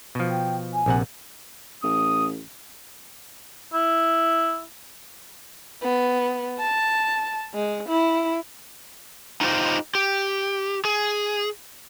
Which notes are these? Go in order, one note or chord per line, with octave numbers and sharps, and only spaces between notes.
B2 F3
G5
G#5
A#1 C3 F#5
A1 D#6
E4
B3
A5
G#3
E4
D#4 F4 G4 C5 D#5
G4
G#4